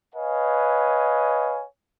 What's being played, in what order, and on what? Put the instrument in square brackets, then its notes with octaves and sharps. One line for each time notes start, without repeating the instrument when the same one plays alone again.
[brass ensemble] B4 C#5 D#5 F5 G#5